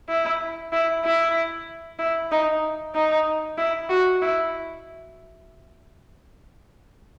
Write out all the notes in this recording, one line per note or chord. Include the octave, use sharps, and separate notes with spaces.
E4
E4
E4
E4
D#4
D#4
E4
F#4
E4